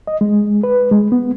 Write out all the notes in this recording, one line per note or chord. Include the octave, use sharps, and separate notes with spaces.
D#5
G#3
B4
G#3
B3